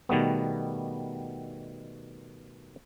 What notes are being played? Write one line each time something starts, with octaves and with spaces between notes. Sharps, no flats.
B2 D#3 G3 A3 B3